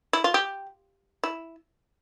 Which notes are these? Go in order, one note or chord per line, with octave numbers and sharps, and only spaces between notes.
E4
F4
G4
E4